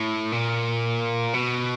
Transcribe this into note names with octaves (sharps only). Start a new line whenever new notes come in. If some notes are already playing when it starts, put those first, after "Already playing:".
Already playing: A2
A#2
B2